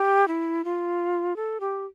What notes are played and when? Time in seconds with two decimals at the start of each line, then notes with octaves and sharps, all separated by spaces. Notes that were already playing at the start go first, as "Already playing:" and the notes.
Already playing: G4
0.28 E4
0.65 F4
1.36 A4
1.60 G4